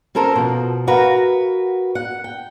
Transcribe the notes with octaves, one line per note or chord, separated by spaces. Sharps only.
C4 C#4 A4 A#4 C5
B2 F3
F#4 A#4 B4 F5
F#5
G5